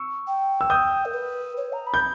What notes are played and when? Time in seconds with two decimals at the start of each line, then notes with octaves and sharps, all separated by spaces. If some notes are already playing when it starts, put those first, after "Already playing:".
Already playing: C#6 E6
0.27 G5
0.61 E6
0.70 D#6 G6
1.05 A#4
1.14 B4
1.57 C#5
1.73 A#5
1.87 B5
1.94 G6